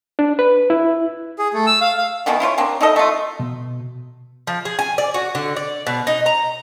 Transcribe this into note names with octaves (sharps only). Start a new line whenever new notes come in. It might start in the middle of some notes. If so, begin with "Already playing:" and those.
D4
B4
E4
G#4
A3
E6
F5
F5
B2 D#3 E3 B3
E4 F4 C5 C#5
A#3 C4 D4
D#4 E4 A4 D#5
A3 F4
B2
F3
G#4
G#5
D5
F#4
D3
D5
B2
D#4
A#5